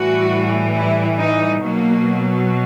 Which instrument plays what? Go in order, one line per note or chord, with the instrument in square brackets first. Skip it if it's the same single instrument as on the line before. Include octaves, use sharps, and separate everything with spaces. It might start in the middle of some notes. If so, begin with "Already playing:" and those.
Already playing: [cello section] A2 E3 G3 F#4
E4
D#4
B2 F#3 A#3